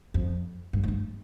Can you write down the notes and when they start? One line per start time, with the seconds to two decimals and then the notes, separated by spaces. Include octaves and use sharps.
0.14 F2
0.73 G2
0.84 G#2
0.88 G2